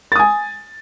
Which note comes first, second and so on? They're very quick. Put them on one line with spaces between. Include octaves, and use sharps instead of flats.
A6 D#6 G#5